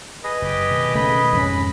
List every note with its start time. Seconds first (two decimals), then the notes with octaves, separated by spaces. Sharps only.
0.24 G#4 B4 D#5
0.42 F#1 G4
0.71 B2 D#3
0.95 C#3 A3 B5
1.33 F2 G#2 C#4 B5